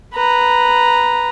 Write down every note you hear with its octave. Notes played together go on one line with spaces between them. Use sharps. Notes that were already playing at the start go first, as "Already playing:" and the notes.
B4 A#5